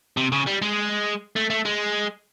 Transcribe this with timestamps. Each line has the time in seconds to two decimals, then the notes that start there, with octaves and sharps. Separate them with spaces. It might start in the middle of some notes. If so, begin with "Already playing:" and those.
0.17 C3
0.32 C#3
0.47 G3
0.62 G#3
1.36 A3
1.50 A3
1.65 G#3